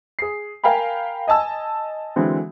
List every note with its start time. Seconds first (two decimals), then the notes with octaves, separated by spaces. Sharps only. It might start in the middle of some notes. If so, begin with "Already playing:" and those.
0.19 G#4 C7
0.64 A#4 F5 G5 G#5 B5
1.28 D#5 G#5 A5 E6
2.16 D3 E3 F#3 G#3 C4